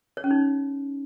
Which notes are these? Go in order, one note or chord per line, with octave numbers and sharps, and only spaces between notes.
C#5
C#4
D#4